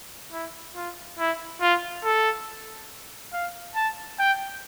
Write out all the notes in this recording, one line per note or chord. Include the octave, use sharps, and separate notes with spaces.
E4
F4
E4
F4
A4
F5
A5
G5